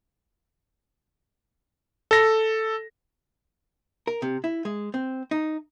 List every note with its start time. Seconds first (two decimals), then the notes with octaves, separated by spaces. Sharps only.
2.11 A4 A#6
4.07 A#4
4.22 C3
4.44 E4
4.65 G#3
4.94 C4
5.31 D#4